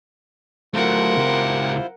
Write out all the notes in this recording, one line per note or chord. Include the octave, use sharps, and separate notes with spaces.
F#3 A3 E4 F4 A#4 C5 F#5
C#2 G4